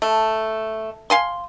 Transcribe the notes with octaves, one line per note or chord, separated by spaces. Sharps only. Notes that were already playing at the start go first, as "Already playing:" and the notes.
A3
F5 G#5 C6